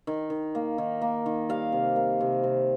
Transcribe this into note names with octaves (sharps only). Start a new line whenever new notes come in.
D#3
D#3
A#3
D#3
A#3
D#3
G3 F5
C3
A#3
C3
C3